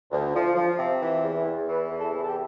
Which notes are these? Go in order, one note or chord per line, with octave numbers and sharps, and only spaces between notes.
D2
F3
F3
C3
E3
E2
E2
E3 B4
E2
A4
C3
A4
G4